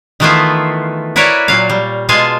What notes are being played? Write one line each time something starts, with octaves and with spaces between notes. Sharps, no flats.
D#3 E3 A3 B3 E4 F4
E4 F#4 A#4 B4 C#5 D5
A#2 F#3 F5
G3
B2 G#3 F4 F5 G#5 A5